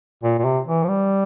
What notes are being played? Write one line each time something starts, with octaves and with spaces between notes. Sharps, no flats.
A#2
A#2
C3
E3
F3
G3